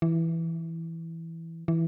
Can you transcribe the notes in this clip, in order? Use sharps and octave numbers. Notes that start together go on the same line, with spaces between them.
E3
E3